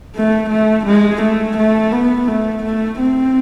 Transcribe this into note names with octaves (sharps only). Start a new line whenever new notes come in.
A3
A3
G#3
A3
A3
B3
A3
A3
C4